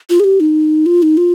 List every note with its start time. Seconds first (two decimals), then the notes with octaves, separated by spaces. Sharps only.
0.10 F4
0.20 G#4
0.24 G4
0.40 D#4
0.86 F4
1.02 D#4
1.17 F4